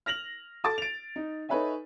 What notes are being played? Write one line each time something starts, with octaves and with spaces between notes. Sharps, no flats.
F6 A#6 F7 F#7
A4 A5 D6 A6
D7 F7
D#4
D#4 A4 B4 C#5 E5 G#5